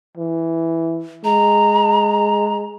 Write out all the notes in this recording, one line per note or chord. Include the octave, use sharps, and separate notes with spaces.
E3
G#3 A#5